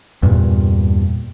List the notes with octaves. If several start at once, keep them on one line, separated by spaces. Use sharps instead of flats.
E2 G2 A#2